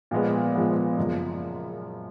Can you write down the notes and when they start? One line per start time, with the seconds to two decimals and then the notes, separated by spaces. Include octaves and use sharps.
0.11 A#2 F3 G#3 B3
0.55 A#2 F3 G#3 B3
0.98 F#1 F#2 C#3 F3